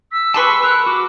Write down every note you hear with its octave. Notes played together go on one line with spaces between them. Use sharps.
E6 B6
G4 G#4 B4 A5 C6 C#6
A#4 F#6
F#4 D6